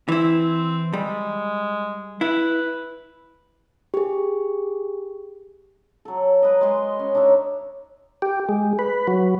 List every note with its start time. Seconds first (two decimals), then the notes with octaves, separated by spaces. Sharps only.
0.09 E3 C4 E4
0.93 G3 G#3
2.21 E4 B4
3.94 G4 G#4
6.05 F#3 A4
6.42 A#4 B4 D#5
6.61 G#3 C6
6.99 C#4
7.15 D4 D#4 C#5 E5
8.22 G4
8.49 G#3
8.79 B4
9.07 F#3